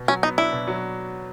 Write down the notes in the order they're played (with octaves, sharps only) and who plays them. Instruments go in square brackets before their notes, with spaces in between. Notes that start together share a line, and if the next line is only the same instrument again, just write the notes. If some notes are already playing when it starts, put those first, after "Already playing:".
Already playing: [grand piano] B2
[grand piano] F#3 [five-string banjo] C#4
[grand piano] B3 [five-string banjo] D#4
[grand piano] D4 [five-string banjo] E4
[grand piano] B2
F#3